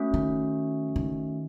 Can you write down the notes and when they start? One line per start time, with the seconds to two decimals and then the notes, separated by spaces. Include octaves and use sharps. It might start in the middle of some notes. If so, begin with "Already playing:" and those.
Already playing: A3 C#4 F#4
0.14 D#3
0.96 D#3